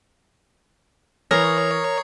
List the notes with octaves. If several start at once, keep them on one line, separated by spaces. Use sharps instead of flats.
E3 A#4 C#5 D#6 C7